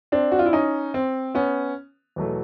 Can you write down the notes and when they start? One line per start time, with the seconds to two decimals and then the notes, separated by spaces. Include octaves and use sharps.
0.12 C4 D4
0.32 F#4
0.39 F4
0.46 E4
0.53 C#4 D#4
0.94 C4
1.35 B3 C#4
2.16 E2 B2 F#3 A3